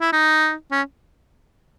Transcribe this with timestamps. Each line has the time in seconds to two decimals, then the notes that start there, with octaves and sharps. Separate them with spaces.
0.01 E4
0.13 D#4
0.71 C#4